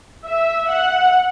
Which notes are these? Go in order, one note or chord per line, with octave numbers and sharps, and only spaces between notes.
E5
F#5